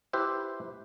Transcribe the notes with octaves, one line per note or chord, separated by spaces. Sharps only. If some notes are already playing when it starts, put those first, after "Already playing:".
E4 G4 B4 C5 E5